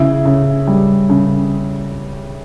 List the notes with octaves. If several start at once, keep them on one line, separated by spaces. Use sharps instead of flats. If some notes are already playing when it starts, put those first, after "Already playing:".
Already playing: C#3 E4
C#3
G3
C#3